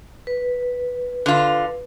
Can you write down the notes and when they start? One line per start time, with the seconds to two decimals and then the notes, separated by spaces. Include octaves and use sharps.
0.27 B4
1.26 D3 F4